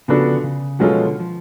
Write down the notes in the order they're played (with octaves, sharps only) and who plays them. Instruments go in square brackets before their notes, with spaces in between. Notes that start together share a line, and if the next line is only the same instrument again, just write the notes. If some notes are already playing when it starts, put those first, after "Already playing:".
[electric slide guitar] C#3 [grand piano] F3 B3 D4 F#4 A4
[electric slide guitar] D3
C#3
[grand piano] B2 G#3 C#4 F4 A4 [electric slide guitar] F#3
[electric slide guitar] F3
D3
F3